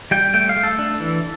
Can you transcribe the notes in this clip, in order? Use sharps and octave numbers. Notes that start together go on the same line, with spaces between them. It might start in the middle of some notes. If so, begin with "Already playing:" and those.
G3 G5
A3 G5
F5
A3
A4
D4
E3